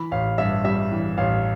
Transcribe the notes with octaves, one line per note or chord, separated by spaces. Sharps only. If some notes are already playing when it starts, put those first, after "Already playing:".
Already playing: E3 B5
A1 F5
G2 E5
G3 E5
E3
A1 F5